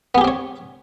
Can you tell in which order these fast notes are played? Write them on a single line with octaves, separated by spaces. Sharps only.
B3 G#4 G4 C4 C#5